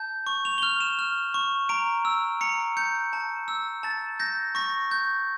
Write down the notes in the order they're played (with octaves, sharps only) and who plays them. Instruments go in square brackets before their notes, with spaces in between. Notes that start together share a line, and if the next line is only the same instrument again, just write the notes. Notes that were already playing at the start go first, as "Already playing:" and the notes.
Already playing: [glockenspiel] A5 G6
C#6
F7
G7
F6 F7
E7
F6
C#6
A#5 D7
E6
A#5 C#7
G6 C#7
A5
E6
A5 A6
G6 A#6
C#6 A#6
G6